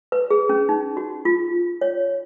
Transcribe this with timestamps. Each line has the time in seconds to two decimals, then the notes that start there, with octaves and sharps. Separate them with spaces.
0.12 B4
0.31 G#4
0.49 C#4
0.69 D#4
0.97 F#4
1.25 F4
1.81 C#5